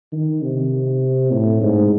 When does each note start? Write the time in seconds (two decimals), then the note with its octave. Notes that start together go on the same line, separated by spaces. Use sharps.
0.12 D#3
0.42 C3
1.31 A2
1.61 G#2